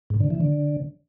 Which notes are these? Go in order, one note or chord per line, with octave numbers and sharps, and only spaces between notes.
G#2
D3
E3
D3